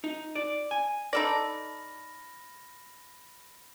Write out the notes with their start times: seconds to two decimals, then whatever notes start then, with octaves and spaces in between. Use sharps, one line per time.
0.04 D#4
0.35 D5
0.71 G#5
1.13 D#4 A4 D5 B5 F6 A#6